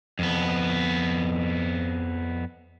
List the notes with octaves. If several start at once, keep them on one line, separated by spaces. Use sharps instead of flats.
F2 B3